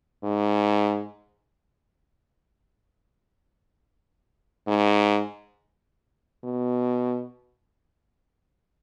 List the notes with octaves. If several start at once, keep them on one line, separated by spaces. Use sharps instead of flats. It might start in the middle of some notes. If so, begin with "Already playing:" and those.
G#2
G#2
B2